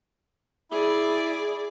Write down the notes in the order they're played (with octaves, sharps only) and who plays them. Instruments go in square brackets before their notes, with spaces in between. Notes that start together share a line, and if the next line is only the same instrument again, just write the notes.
[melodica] E4 [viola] G#4 D5